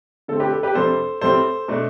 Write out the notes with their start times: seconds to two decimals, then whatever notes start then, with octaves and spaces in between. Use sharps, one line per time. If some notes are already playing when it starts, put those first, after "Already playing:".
0.28 D3 A3 C4 A4
0.40 G4 B4
0.52 A4
0.63 G4 B4
0.75 F2 C3 G3 D4 A4 C5
1.21 A2 G3 C4 A4 C5
1.68 B2 A3 D4